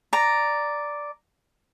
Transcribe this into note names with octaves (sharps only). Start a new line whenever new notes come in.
D5 A#5